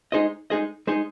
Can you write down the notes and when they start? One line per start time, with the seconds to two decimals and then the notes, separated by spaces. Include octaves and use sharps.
0.12 G#3 D#4 G#4 C5 D#5
0.50 G#3 D#4 G#4 C5 D#5
0.87 G#3 D#4 G#4 C5 D#5